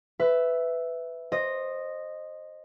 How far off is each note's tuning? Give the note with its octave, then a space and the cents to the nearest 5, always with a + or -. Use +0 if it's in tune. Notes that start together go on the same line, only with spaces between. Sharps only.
B4 +15 E5 +0
C5 +15 D#5 -10